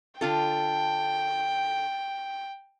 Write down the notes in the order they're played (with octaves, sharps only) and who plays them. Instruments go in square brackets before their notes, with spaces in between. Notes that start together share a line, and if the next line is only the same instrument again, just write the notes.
[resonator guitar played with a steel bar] D3 F4 A4 [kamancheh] G5